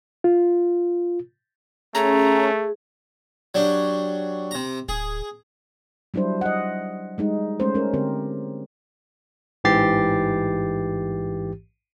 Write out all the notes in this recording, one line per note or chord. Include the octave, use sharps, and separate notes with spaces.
F4
A3 C#4 G#4 A#5
F#3 D4 G4
C3 A#5
D1 G#4
F#3 G3 D4 E4 C5
D#5 F#5
G3 G#3 D#4
G#3 A3 C#4 C5
C#4 A#4
D3 C4 G4 A#4
A1 G#2 E3 G4 A6 C7